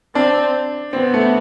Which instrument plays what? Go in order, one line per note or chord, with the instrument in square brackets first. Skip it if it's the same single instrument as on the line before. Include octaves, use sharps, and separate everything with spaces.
[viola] C4 [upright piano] D4
[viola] B3 [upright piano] C4
[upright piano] A3